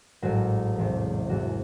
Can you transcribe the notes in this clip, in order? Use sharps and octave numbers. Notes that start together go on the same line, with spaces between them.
A1 G#2 F#3 A3 F#4
E1 E2 C3
G#1 G#2 E3 F#4